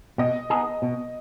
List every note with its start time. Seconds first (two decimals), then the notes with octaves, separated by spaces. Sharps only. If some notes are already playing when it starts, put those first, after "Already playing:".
0.18 B2 D#5
0.50 B3 D#4 G#4
0.82 B2